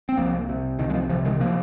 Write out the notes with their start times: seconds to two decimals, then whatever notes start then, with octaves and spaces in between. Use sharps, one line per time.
0.09 C4
0.17 C2 F3 A#3
0.49 C3
0.79 C2 D#3
0.90 G#3
0.94 F3
1.09 C3 F3
1.25 D#3 G#3
1.40 C3 F3 A#3